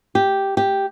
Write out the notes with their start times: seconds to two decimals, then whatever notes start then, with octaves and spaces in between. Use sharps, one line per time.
0.15 G4
0.57 G4